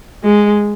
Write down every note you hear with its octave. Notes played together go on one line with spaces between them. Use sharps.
G#3